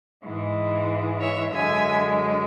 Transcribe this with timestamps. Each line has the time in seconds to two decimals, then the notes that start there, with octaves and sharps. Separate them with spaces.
0.23 G#2 E3 G#3
1.20 C#5 E5
1.53 F#2 D3 G#3 E5 G#5